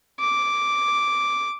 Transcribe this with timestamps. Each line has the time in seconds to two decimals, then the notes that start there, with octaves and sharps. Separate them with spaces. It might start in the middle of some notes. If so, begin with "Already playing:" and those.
0.20 D6